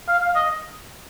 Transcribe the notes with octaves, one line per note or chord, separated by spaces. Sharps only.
F5
F5
D#5